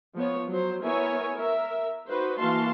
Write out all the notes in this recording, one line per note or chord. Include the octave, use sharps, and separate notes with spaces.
F3 B3 C#5
F#3 C5
B3 E4 A#4 C#5 E5 G#5
A#4 E5
D#4 F#4 B4 C5
E3 A#3 F#4 F5 A5 C6